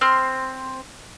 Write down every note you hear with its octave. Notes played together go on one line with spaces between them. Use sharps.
C4 C6 F6